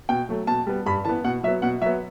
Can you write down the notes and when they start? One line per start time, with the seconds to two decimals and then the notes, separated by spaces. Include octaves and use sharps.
0.09 B2 G5
0.29 F#3 A3
0.47 B2 A5
0.67 G3 B3
0.86 G2 B5
1.05 E3 B3 A5
1.24 B2 F#5
1.43 F#3 E5
1.48 B3
1.62 B2 F#5
1.81 F#3 E5
1.86 B3